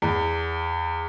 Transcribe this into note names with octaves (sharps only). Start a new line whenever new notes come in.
E2